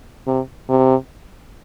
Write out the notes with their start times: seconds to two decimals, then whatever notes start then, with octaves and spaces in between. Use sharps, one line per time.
0.27 C3
0.69 C3